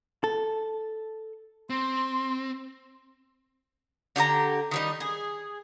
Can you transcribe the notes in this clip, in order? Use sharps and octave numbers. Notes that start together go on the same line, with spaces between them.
A4
C4 C6
D3 G4 D5 A#5
D#3 G3 D#4
G#4